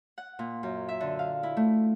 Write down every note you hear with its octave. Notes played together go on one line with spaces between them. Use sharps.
F#5
A#2
F#2
E5
D3
F5
E4
A3